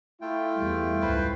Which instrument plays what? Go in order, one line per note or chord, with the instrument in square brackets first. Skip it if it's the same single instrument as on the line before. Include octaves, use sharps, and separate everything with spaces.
[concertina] A3 F4 G5 [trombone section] E4
[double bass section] E2 G3
[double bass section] C#2 G#2 [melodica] B4 C5